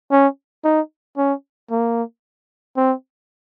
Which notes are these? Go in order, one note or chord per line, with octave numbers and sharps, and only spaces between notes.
C#4
D#4
C#4
A#3
C4